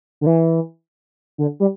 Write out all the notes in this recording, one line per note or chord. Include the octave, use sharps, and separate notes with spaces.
D3
E3
D3
G3